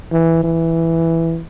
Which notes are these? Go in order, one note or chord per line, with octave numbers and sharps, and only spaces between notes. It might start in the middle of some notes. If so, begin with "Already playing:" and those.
E3
E3